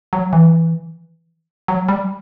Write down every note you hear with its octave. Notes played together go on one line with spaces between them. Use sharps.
F#3
E3
F#3
G3